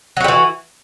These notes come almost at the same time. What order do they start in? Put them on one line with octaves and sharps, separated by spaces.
F#3 F#4 G3 E3